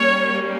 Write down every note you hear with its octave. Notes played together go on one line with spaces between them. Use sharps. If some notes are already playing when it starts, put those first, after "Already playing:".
Already playing: G3 A#3 C#4 C#5